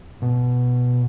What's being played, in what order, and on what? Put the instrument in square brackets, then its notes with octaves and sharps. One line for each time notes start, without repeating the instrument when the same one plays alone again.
[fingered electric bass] B2